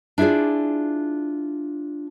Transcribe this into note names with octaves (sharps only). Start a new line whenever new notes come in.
D4 E4 F4 G#4 D5